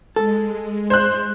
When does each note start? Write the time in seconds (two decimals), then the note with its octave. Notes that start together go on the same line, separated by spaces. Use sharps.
0.16 G#3 A4
0.90 C5 F#6